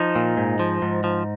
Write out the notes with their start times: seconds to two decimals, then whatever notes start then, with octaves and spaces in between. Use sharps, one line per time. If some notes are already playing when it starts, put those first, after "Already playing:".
Already playing: F3 D#4
0.16 A#2
0.37 G#2
0.59 F3
0.82 G#2
1.04 F3